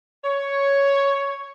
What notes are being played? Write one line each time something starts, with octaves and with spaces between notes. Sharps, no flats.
C#5